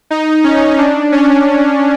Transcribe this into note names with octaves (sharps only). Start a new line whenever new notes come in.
D#4
C#4
D4
C#4